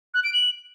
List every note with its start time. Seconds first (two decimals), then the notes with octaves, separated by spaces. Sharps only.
0.14 F#6
0.24 D7
0.33 F#7